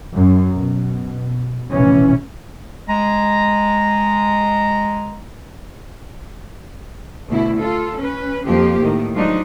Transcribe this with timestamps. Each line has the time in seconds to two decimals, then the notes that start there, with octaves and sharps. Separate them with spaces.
0.13 F#2
0.55 B2
1.70 F1 A#1 B2 E3 C#4
2.88 G#3 A#5
7.28 D2 B2 E4
7.58 F4 A4
7.96 C#4 B4
8.45 F2 F3 A#3 C4 G4
8.82 A2 D#3
9.13 F3 F#3 G#3 D4 D#4